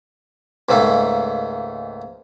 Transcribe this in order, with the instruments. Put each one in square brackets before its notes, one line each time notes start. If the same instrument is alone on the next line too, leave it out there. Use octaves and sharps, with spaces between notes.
[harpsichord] C#2 G#2 A3 A#3